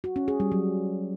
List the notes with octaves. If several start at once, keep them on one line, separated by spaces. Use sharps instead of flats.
F#4
C#4
G#4
G3
F#3